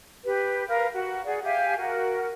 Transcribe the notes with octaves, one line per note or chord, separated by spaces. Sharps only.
G4 B4
A#4 B4 F5
F#4
G#4 D5 F#5
G4 E5 F5 G#5
F#4 A#4